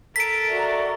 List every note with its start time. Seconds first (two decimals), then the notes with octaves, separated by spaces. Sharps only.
0.16 A4 A#4 B6 D7
0.48 F#4 D5 E5